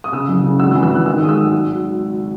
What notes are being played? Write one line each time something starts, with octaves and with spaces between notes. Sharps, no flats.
D#6
C#3 E6
F#1
C#3
G#1 E6
E6
E3
E6
E3 F#6
D#3 E6
G#3 D#6
E6
G#1
F#3 E6